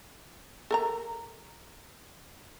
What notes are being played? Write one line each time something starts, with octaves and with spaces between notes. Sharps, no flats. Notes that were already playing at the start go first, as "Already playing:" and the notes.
A4 A#4 A#5